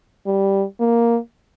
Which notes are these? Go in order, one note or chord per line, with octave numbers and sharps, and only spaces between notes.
G3
A#3